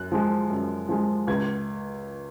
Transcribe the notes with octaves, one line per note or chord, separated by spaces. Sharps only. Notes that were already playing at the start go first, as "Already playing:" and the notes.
Already playing: F#2 F#6
F3 G#3
F#2
F3 G#3
C#2 G#6